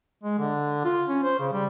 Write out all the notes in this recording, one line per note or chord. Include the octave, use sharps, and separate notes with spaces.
G#3
D3
F4
C#4
C5
C#3
G3